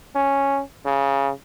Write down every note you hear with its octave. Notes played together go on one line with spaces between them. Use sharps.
C#4
C#3